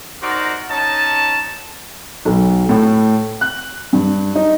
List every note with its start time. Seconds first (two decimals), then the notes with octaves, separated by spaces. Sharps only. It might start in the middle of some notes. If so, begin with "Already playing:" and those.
0.21 D#4 F#4 A#4 C5 D5
0.69 C#4 D#4 A5
2.25 B1
2.69 A2
3.41 F#6
3.93 G2
4.35 D#4